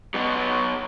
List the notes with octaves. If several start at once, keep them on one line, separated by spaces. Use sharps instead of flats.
B2 F#3